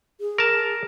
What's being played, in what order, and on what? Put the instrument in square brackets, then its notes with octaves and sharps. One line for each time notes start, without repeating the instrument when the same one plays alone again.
[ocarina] G#4
[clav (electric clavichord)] A#4 A5